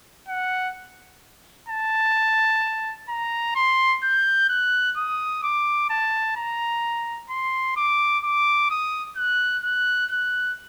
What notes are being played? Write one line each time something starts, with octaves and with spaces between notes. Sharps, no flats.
F#5
A5
A#5
C6
G6
F#6
D#6
D6
A5
A#5
C6
D6
D6
D#6
F#6
F#6
F#6